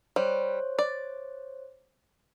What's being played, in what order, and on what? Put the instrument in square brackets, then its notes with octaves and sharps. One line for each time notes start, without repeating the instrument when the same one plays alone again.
[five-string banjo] G3 [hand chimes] C5 C#5
[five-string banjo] D5